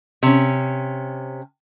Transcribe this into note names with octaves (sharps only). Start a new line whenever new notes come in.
C3 C#4